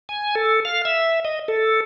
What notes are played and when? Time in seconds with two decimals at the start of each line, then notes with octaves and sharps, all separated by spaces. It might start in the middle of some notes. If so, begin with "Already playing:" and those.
0.09 G#5
0.35 A4
0.65 F5
0.85 E5
1.25 D#5
1.48 A4